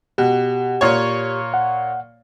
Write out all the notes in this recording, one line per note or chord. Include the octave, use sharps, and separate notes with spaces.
B2 G4
A#2 C#5
F#5